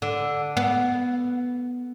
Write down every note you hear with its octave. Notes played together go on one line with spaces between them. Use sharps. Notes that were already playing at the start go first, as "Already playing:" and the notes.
D3
B3